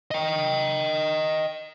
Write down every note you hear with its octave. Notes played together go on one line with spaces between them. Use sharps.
D#5 G5